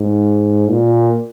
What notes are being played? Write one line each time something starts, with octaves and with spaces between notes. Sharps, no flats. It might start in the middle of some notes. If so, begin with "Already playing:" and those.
Already playing: G#2
A#2